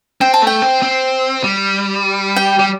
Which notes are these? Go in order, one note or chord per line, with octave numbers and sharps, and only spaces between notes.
C4 G5
A5
A3 G5
C4
C4
G3
G5
G3